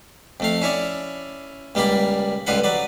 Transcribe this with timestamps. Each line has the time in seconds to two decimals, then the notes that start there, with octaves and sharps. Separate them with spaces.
0.40 F2 A3 F5
0.62 C#4 E4 C#5 D5
1.75 C#2 G3 A#3 D5 B5
2.47 C#2 G2 D3 F4 B4 F#5
2.64 F#3 B4 D5